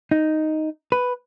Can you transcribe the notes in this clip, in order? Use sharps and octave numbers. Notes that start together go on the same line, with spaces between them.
D#4
B4